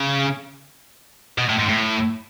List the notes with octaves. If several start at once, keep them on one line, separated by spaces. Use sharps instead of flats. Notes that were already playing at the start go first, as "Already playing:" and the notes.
Already playing: C#3
B2
A2
G#2
A2